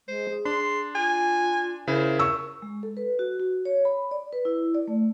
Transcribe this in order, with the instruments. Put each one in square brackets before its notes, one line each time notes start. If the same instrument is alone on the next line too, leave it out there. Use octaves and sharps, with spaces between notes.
[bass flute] G#3 [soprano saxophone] C5
[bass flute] G#4
[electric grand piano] D4 [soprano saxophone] C6
[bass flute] F4 [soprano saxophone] G#5
[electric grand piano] C#3 E4 [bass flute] A#4 [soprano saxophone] C5
[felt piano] C#6 E6
[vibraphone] G#3
A4
B4
F#4
F#4
C#5
B5
D5
B4
E4
D5
A3